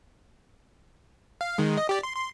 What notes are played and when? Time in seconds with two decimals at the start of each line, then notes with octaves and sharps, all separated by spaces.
1.41 F5
1.58 D#3 G#3
1.77 D#5
1.89 G4 D5
2.03 C6
2.15 C6